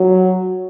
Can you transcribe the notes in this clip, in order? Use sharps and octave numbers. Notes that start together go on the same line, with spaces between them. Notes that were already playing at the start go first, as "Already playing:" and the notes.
Already playing: F#3